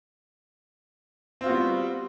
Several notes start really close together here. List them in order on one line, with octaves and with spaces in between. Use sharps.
C4 F4 F#4 B3 G3